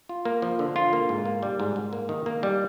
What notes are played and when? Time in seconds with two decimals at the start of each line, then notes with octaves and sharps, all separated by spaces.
0.09 F4
0.25 A#3
0.42 F3
0.59 D3
0.76 F4
0.93 A#3
1.09 G#2
1.25 A#3
1.43 G3
1.60 G#2
1.76 G#2
1.93 A#3
2.09 D#3
2.26 A#3
2.43 G3